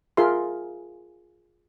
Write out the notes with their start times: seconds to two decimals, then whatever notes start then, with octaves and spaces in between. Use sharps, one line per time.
0.17 F4 G#4 A#4 E5 C6